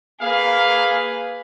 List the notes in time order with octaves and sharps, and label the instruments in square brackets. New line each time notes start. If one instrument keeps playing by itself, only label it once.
[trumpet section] A#3 F5 [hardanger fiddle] G#4 B4